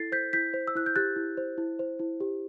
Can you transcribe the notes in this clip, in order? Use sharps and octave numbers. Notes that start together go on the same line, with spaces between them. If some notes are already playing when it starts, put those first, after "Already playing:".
Already playing: E4 A4 A6 C7
C5 G6 B6
E4 G6 B6
C5
E6
E4 F#6
G6
G4 F#6 A6
E4
C5
E4
C5
E4
G4